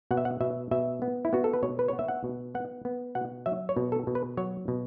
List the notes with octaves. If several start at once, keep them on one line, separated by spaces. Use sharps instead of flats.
B2 F#5
E5
F#5
B2 E5
B2 E5
B3
E4
B3 F#4
A4
B4
B2 C#5
B4
B3 C#5
E5
F#5
B2
B3 F#5
B3
B2 F#5
F#3 E5
C#5
B2
A4
B2
B4
F#3 C#5
B2